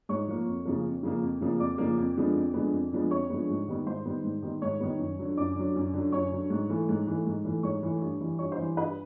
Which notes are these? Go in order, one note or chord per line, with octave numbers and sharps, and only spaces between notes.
G#2 C#5 C#6
F3 A#3
F2
C#3 F3 A#3
F2
C#3 F3 A#3
F2
C#3 F3 A#3
F2 D5 D6
C#3 F3 A#3
F2
D3 F3 G#3 B3
F2
D3 F3 G#3 B3
F2
D3 F3 G#3 B3
F2 C#5 C#6
D3 F3 G#3 B3
G#2
D#3 G3 B3
G#2 C5 C6
D#3 G3 B3
G#2
D#3 G3 B3
G#2 C#5 C#6
D#3 G3 B3
F#2
D3 F#3
F#2 D5 D6
D3 F#3
F#2
D3 F#3
F#2 C#5 C#6
D3 F#3
G#2
E3 A3
G#2
E3 A3
G#2
E3 A3
G#2 C#5 C#6
E3 A3
G2
E3 G3
G2 C#5 C#6
C5 C6
E3 G3
G2 B4 B5